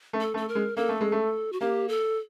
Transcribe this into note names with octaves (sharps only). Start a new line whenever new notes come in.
A3
A4
A3
A4
A#4
G#3
A#3 A4
A3
G#3
A3
F#4
A#3 G4
A4